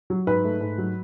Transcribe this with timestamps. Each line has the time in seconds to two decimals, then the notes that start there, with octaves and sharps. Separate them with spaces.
0.10 F#3
0.27 G#2 B4
0.44 A3
0.61 G#2
0.78 F#3